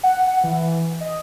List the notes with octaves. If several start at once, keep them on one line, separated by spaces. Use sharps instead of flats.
F#5
F#5
E3
D#5